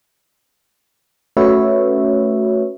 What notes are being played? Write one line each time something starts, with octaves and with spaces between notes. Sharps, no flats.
A3 C#4 F#4 B4 C#5 E5